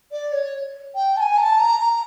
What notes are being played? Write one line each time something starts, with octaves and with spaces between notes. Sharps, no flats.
D5
C#5
G5
A5
G#5
A#5
A5
A#5
A#5